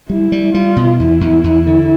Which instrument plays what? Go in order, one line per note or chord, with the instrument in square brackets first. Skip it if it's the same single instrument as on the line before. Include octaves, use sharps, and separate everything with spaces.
[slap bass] G3 [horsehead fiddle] E4
[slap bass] G3
[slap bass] G3 [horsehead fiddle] F4
[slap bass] B2
[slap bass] E2 [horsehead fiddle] E4
[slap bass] E2
E2
D3